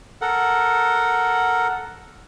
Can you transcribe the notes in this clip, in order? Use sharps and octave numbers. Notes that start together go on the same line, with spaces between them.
A4 A#4 F#5